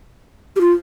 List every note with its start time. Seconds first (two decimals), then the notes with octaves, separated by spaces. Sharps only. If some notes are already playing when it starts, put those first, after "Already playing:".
0.56 G4
0.61 F4